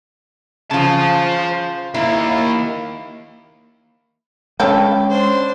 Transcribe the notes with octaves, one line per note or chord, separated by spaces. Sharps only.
C#3 F4 C5 A5
D#3 A#3 E4
D3 G#3 C#4 A4 C#5 G5 B5
D4 C5